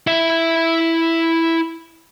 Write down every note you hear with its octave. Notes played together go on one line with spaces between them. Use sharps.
E4 E5